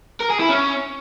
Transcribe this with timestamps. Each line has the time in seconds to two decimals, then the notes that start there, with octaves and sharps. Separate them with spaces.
0.20 A#4
0.30 G#4
0.40 E4
0.49 C#4